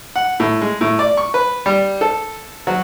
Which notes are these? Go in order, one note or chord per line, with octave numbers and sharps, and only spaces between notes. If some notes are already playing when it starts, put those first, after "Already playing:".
F#5
A2
G#3
A2
D5
C#6
B4
G3
A4
F#3